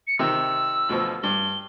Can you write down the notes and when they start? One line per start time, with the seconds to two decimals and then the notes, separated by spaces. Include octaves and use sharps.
0.07 C#7
0.19 C3 D#3 E6
0.89 D2 B2 F3
1.23 G2 G7